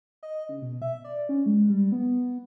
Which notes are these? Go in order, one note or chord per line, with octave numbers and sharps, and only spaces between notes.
D#5
C#3
B2
E5
D5
C#4
G#3
G3
B3